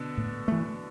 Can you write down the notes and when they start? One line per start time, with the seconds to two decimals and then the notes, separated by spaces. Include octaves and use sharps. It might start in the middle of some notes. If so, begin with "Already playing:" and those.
Already playing: B2 D3
0.17 A2
0.48 E3 A3